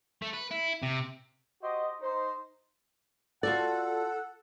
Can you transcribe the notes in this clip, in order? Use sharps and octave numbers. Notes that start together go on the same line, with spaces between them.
A3
B4
E4
C3
F#4 G4 C5 D#5
D#4 C5
F4 F#4 A4 D5 F#5